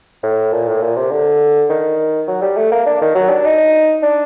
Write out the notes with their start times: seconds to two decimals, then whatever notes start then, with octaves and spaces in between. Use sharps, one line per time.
0.23 A2
0.53 A#2
0.68 A2
0.82 A#2
0.96 C3
1.12 D3
1.70 D#3
2.28 F#3
2.42 G3
2.57 A3
2.72 A#3
2.86 D4
3.01 D#3
3.15 F#3
3.30 D4
3.45 D#4
4.03 D4